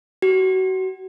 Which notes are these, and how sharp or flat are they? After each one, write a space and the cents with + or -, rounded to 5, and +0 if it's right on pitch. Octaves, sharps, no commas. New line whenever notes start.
F#4 +25